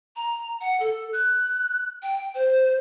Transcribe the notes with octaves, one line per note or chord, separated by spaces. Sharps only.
A#5
F#5
A4
F#6
G5
C5